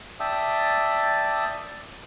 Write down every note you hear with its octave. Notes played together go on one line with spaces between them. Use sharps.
D5 E5 G5 A5 D#6 E6